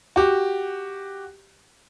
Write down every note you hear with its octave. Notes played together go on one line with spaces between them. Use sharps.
F#4 G4